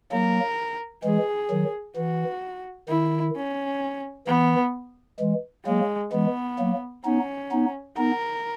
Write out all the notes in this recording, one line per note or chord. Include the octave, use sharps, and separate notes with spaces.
F#3 A#3 A#4
E3 G#3 G#4
D#3 F#3
E3 F#4
D#3 E4
C#4
E3 B3
E3 G#3
F#3 G#3 A#3
E3 G#3 B3
F#3 A#3
B3 C#4 D#4
B3 D#4
B3 D#4 A#4